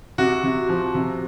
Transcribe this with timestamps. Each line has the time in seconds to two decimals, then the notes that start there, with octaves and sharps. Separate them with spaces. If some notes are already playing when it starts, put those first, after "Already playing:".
0.18 C3 F#4
0.44 C3
0.69 F3
0.95 C3